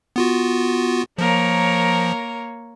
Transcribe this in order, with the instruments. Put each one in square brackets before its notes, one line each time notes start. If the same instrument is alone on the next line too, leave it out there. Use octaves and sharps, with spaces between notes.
[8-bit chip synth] B3 F4 F#4
[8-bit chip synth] F3 [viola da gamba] A#3 A#4 C#5